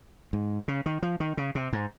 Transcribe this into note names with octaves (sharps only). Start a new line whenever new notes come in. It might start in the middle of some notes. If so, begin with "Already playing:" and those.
G#2
C#3
D#3
F3
D#3
C#3
C3
G#2